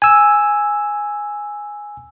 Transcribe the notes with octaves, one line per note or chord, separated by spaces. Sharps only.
G#5 E6